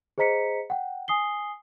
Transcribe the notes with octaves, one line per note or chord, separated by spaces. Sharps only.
G#4 C5 D#5 A#5 B6 C#7
F#5 G5
G#5 D#6 C7 G7